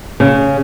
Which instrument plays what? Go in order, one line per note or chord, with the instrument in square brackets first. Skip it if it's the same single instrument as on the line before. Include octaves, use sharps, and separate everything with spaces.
[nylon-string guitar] C#3